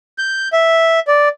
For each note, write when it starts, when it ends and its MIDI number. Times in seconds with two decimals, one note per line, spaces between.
0.18 0.48 91
0.53 1.00 76
1.08 1.28 74